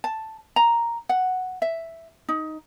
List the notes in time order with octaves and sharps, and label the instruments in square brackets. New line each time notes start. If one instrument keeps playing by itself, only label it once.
[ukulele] A5
A#5
F#5
E5
D#4